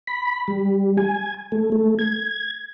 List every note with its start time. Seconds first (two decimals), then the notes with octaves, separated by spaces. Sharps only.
0.07 B5
0.48 G3
0.97 G#5
1.52 A3
1.72 A3
1.99 G#6